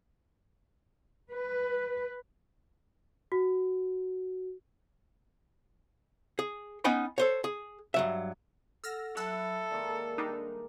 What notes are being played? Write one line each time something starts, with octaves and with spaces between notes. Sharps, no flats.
B4
F#4
G#4
B3 C#4 D#4 G5 G#5 B5
A4 C5 C#5
G#4
G2 F#3 E5
A4 F#5 E6 F6 A#6
F#3 E4 A4 E6 F#6
D#3 G#3 A#3 D5
G3 D4 D#4